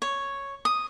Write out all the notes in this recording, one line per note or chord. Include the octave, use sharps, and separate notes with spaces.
C#5
D#6